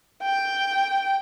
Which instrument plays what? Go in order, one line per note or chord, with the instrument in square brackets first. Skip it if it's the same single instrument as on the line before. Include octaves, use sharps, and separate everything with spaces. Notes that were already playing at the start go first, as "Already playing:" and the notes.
[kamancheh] G5